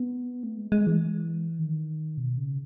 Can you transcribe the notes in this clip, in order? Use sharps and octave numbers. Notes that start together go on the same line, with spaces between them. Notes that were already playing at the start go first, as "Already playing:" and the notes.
Already playing: B3
A3
G#3
G#3
E3
D#3
B2
C#3